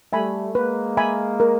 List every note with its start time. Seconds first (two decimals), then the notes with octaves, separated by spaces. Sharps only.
0.12 G3 A3 E5 G#5 B5
0.55 G#3 A#3 B4
0.97 E5 G#5 B5
1.40 A#4